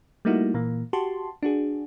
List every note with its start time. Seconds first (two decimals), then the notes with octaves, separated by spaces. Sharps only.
0.25 G3 A3 A#3 D#4 E4 F#4
0.54 A#2 E3 A#3
0.93 F#4 G4 A5 C6
1.43 D4 F#4 G#4